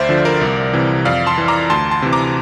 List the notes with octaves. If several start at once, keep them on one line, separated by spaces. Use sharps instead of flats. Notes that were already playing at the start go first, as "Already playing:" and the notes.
Already playing: D2 C5 D5 E5 F5
D3 F3
A#4 D5
C2
C3 E3
F2 D5 F5
A5 C6
E3
A#5 D6
D2 A5 C6
A5 C6
C3 E3
A#5 D6